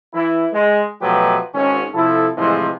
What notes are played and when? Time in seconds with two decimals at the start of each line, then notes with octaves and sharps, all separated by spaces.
0.14 E3 E4
0.52 G#3
1.02 B2 F3 F#3 A3 G4 B4
1.54 G#1 C#4
1.93 C3 F3 E4 A4
2.37 A2 C3 E3 F3 G#3